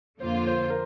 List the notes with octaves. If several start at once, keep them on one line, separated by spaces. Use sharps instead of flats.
F2 D3 A#3 F4 C5
C5
A#4